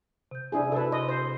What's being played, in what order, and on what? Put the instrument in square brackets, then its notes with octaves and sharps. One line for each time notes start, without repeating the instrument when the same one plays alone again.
[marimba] C3 G6
[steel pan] D4 E4 G#4
[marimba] C3 F#4 G#4 [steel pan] A4 B4
[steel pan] D#5 [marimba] C6
[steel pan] C5